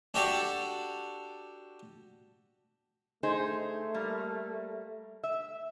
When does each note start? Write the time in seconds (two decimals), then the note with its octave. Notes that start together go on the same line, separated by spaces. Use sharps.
0.14 D4 F#4 G4 A4 D5
3.23 A3 D#4 G#4 C5
3.94 G3 A#3
5.23 E5